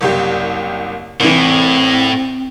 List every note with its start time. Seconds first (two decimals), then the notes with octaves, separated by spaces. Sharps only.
0.01 F#1 C2 G4
1.20 C2 A2 E3 C4